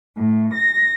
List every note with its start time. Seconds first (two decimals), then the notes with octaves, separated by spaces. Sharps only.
0.17 A2
0.53 A#6